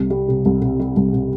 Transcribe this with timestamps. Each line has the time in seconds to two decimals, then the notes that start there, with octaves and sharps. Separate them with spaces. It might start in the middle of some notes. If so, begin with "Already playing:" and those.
Already playing: C2 C3
0.10 G3
0.28 C3
0.46 C2
0.61 C3
0.80 G3
0.97 C2
1.13 C3